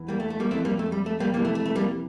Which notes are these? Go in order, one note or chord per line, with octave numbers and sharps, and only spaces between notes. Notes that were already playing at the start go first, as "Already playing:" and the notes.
Already playing: E2 E3
G3 A#3
A3
A3
G3 A#3
F2 E3 A3 C4
G3 A#3
A3
G3
A3
G3 A#3
F2 C3 E3 G3 A#3
A3
A3
A3
G3 A#3